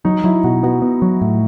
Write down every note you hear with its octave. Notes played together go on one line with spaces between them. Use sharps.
F#3 D#4
F#3 E4
B2 F#4
B3 F#4
B3
F#3
A2